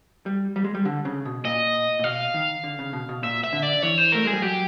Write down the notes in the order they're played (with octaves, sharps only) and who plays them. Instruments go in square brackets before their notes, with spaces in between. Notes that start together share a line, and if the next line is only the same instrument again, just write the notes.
[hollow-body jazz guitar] G3
G3
G#3
G3
D3
C#3
B2
[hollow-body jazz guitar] A#2 [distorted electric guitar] D#5
[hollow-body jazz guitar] A#2
[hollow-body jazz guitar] B2 [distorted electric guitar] F5
[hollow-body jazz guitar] D#3
D3
C#3
B2
B2
[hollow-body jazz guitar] A#2 [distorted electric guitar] E5
[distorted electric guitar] E5
[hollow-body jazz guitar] D3
[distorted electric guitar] D5
[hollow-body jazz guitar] E3 [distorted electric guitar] C#5
[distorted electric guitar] C5
[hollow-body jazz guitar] A3 [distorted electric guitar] A#4
[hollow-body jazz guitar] G#3 [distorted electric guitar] G#4
[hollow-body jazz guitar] G3
[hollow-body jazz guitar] F#3 [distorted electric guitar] G4